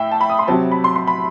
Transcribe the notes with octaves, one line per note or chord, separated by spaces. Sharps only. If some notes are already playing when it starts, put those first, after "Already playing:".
Already playing: A2 E5 G5
A5
B5
D#6
C6
C3 F#3 C4 A5
B5
C6
C6
B5